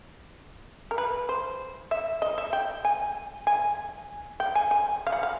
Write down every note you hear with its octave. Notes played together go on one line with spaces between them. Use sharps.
A#4
B4
C5
E5
D#5
E5
G5
G#5
G#5
G5
G#5
G#5
F5
F#5
F5